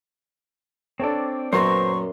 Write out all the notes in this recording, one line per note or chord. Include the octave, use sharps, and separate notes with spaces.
C4 D4 A4 C#5 D5
F#2 A#2 F#3 B3 C5 A#5 C6 C#6